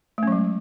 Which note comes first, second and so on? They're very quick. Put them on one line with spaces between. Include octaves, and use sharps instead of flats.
A3 C#4 F#3 G#3